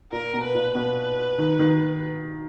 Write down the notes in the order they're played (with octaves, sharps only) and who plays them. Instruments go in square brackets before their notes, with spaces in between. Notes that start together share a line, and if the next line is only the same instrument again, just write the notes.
[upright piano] A#2 [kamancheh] A#4
[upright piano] B2
[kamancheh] B4
[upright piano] A#2
[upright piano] B2 [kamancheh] B4
[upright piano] D#3
D#3